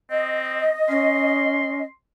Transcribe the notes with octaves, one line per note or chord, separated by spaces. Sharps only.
C4 D#5
C#4 C6